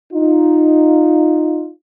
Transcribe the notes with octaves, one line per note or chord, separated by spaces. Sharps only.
D#4 F4